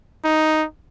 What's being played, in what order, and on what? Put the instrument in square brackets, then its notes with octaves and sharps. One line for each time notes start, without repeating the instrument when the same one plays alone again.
[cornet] D#4